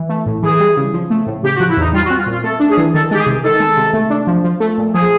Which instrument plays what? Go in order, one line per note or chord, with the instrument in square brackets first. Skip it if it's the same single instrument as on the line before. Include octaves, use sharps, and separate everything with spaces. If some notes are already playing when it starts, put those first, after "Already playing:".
Already playing: [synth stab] E3
A3
A2
[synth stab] E3 [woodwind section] G#4
[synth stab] G3
C#3
F3
A3
A2
[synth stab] C#3 [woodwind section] G4
[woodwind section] F#4
[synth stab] F3
[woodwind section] E4
[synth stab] E2 [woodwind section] D#4
[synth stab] G3 [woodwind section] F4
[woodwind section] F#4
[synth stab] C4
[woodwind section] F4
[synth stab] A#2
[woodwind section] F4
[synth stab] A3 [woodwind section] A4
[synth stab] D4
[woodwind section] G#4
[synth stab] E3
[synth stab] D#3 [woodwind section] A4
[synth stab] G#3 [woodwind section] G4
[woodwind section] G#4
[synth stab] C3
[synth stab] D#3 [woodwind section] A4
[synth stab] G#3
C3
A3
D4
F3
F3
A3
A#2
[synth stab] F3 [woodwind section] G#4